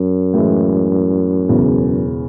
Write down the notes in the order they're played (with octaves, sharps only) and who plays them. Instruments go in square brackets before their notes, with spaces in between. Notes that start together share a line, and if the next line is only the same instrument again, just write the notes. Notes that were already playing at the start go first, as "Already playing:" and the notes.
Already playing: [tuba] F#2
[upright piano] A2 E3 G#3
E1 E2 C#3 E3